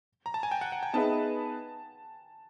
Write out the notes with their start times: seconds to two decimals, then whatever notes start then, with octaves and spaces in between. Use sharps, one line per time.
0.26 A#5
0.34 A5
0.43 G#5
0.51 G5
0.61 F#5
0.72 F#5
0.83 G5
0.93 B3 D#4 G#4 B4 E5 A5